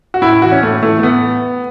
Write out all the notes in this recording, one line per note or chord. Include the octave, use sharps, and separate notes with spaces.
F#4
A2 E4
E4
E3 F#4
C#4
A2 A3
E3 A3
A3
A2 B3